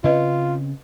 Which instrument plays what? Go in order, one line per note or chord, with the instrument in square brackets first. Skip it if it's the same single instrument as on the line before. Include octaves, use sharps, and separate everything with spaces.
[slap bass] C#3 C4 C#4 [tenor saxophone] F4 [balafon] B4 D#5